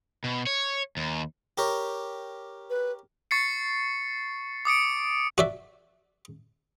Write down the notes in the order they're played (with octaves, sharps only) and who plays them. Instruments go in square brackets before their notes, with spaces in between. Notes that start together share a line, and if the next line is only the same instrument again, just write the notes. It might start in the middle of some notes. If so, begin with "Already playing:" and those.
[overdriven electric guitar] B2
C#5
D#2
[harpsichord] G4 A#4 C#5
[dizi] B4
[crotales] C#6 A6 C7 C#7
D6 D#6 C#7 D7
[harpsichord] F#4 D5 E5